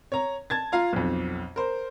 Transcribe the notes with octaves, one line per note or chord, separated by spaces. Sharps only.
C#5 A#5
A5 G#6 A6
F4 F5 A#5
B1 F2
A#4 C5